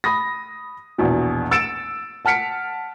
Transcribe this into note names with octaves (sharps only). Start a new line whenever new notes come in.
B5 D#6 A#6
A#1 E2 B2 E3
E6 A6 C#7 D7 E7
F#5 A5 F6 B6 C#7 D7